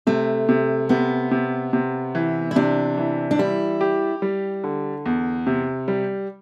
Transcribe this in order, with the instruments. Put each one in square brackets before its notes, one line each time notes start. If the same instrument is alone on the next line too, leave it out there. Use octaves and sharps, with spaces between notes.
[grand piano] C3 [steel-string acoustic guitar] A3
[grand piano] C3
[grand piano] C3 [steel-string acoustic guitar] B3
[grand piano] C3
C3
E3
[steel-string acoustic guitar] E4
[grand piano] C3 [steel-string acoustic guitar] D4
[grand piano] E3
[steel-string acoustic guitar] D4
[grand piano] G3 [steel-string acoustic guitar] E4
[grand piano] G4
G3
D3
E2
C3
G3